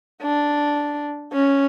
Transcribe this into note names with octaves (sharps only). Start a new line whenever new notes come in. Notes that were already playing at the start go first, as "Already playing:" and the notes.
D4
C#4